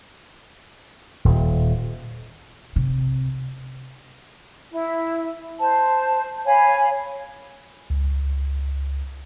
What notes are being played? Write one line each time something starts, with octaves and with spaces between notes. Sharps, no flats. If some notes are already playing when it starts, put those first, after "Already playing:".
D#1
C3
E4
C5 A5
C#5 F5 G#5 B5
C#2